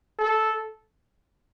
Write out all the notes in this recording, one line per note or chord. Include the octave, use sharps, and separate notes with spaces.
A4